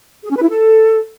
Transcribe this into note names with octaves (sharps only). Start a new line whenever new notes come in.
G#4
C#4
B4
E4
A4